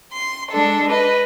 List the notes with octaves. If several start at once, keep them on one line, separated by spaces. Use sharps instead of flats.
C6
G#3 D4 A4
B4 D#5